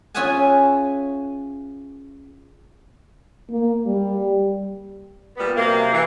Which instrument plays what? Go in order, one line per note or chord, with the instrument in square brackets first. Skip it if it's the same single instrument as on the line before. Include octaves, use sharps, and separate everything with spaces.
[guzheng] C#4 F4 G#4 E5 F#5 G#5
[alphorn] A#3
G3
[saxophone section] A#2 G3 B3
F#2 C3 A#3
E3